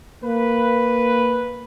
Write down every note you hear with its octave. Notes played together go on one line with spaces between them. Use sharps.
A#3 B4